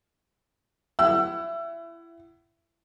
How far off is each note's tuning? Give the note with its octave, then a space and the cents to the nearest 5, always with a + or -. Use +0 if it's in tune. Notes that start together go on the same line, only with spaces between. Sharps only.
E4 +25 F#5 +35 E6 +25